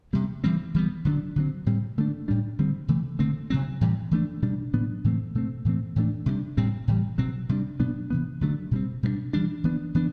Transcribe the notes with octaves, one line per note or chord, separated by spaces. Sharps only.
C3 G3 B3
E3 G3 C4
E3 G3 B3
D3 F#3 B3 D4
D3 F#3 C4
A2 G3 C4
D3 A3 D4
A2 G3 D4
D3 G3 C4
C3 E3 A3
D3 A3 C4
C3 F#3 C4
A2 E3 G3
E3 A3 D4
B2 G3 D4
A2 F#3 B3 D4
A2 E3 A3 C4
B2 A3 C4
A2 E3 A3 C4
A2 E3 A3 D4
C3 G3 B3 D4
A2 G3 C4
A2 E3 G3
B2 F#3 C4
C3 G3 D4
B2 F#3 B3 D4
C3 E3 B3
D3 F#3 A3 D4
B2 G3 C4
B2 G3 B3 D4
E3 G3 D4
E3 B3 D4
E3 B3 D4